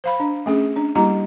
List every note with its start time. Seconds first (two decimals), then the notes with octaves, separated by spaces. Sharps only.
0.04 C5 F5 B5
0.20 D4
0.46 A3 C#4 G#4
0.76 D4
0.95 G3 A#3 E4 G4 A#5